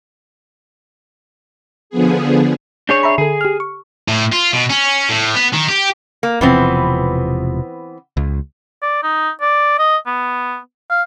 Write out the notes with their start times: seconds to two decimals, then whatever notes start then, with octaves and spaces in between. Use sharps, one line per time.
1.90 D3 F3 B3 G#4
2.89 D4 G#4 C#5 G6
3.03 E5 A#5 B5
3.18 D3 G#4 A4
3.41 G4 F6
3.60 C#6
4.08 A2
4.32 F4
4.53 B2
4.70 C#4
5.09 A2
5.35 B3
5.53 D#3
5.69 G4
6.23 A#3
6.41 E1 C3 E3 F3 B3 C4
8.17 C#2
8.82 D5
9.03 D#4
9.41 D5
9.79 D#5
10.06 B3
10.90 F5